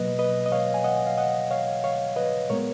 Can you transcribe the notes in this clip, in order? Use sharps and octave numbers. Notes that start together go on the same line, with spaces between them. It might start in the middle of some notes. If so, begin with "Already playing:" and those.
Already playing: B2 F#3 A#3 B4 D#5
B4 D#5
D#5
C#5 F5
G#5
D#5 F#5
F5
D#5 F#5
C#5 F5
C#5 F5
B4 D#5
A#2 G#3 B3 A#4 C#5